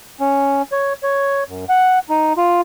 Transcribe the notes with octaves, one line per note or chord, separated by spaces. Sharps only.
C#4
C#5
C#5
F#2
F#5
D#4
F4